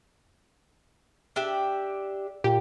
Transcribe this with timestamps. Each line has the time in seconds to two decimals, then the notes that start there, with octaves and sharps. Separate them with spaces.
1.36 D4 G4 E5
2.44 A#2 G4